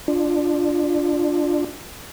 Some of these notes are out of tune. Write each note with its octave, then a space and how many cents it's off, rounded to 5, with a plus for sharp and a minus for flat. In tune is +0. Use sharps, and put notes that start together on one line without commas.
D4 +0 F4 +0 D5 +30